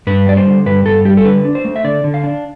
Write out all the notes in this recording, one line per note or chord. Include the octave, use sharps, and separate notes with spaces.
G2 B4
G3 D5
C5
D3
G2 B4
G2 A4
G3 G4
A4
D3 B4
D4
C5
A3
E5
D3 D5
D3
F5
D4